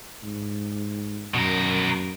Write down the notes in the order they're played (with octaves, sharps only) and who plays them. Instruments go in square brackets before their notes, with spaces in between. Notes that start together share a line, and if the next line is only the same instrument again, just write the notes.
[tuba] G#2
[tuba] F#2 [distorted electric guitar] B2 A#4